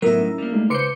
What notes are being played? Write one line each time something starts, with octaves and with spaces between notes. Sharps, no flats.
A2 F#3 A3 B3 D#4 E4 A#4
C#4
G3 A#3
G#3 A3 D#4
C#2 B4 C5 C6 D6 C#7